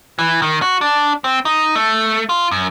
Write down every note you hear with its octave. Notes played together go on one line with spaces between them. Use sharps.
E3
D#3
F#4
D4
C4
D#4
A3
F4
F#2